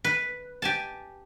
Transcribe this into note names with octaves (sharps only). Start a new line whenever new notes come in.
B4
G4 G#5 A5